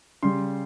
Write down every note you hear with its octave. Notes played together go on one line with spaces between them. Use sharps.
C#3 G3 C6